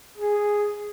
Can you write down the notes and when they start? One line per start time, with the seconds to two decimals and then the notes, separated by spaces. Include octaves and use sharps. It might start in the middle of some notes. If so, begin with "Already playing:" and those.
0.18 G#4